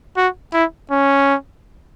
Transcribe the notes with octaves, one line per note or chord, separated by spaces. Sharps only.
F#4
E4
C#4